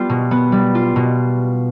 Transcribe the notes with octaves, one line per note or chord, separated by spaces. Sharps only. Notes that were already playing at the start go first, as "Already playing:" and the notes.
Already playing: G3 B3 F4
B2
B3
G3
F4
B2